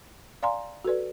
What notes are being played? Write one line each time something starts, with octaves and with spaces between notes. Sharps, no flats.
D5 F5 G#5 A#5 C6
F#4 A4 B4 D5